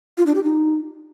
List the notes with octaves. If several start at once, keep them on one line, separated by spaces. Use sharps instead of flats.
F4
D4
G4
D#4